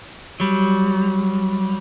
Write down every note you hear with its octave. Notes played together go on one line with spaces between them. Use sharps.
F#3 G3